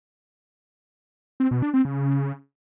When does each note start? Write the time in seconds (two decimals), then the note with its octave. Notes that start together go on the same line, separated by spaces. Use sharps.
1.40 C4
1.51 B2
1.62 D4
1.74 C4
1.85 C#3